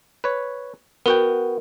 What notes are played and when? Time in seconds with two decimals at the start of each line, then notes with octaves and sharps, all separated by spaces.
0.24 B4 C#5
1.06 B3 F#4 A#4 G5